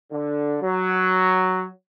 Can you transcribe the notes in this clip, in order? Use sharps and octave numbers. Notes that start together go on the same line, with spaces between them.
D3
F#3